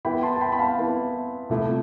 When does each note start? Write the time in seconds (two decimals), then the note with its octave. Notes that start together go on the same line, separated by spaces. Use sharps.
0.05 E3 B3 E4 G5 B5
0.23 A5 C6
0.36 A5
0.41 G5 B5
0.52 B5
0.59 F5 A5
0.77 E3 B3 E4
1.50 C3 F3 A3 E4